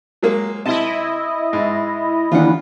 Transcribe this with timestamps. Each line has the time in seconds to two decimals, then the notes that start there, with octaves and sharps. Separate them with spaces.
0.23 F#3 G#3 A#3
0.66 C3 E4 D#5 A5
1.53 G#2
2.32 D#2 E3 D4 F4 F#5